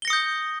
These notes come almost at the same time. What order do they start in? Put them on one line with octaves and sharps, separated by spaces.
G7 A#6 C#7 D#6 G6